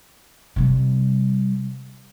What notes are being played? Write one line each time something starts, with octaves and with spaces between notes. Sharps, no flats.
C3 G3